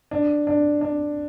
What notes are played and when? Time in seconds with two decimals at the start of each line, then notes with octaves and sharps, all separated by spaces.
0.11 D4
0.47 D4
0.81 D4